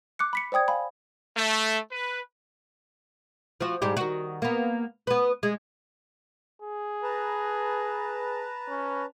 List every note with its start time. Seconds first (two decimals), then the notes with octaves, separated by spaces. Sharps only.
0.19 D6 F#6 C#7
0.33 B5 B6 C#7
0.52 C5 D5 G5 D#6 G#6
0.68 F5 G#5 B5
1.36 A3
1.91 B4
3.61 F3 F#4
3.82 G#2 G3 G4
3.97 D#3 F#4
4.42 A#3 B3
5.07 B3 B4
5.43 G#3
6.62 G#4
7.03 B4 A5 A#5
8.68 C#4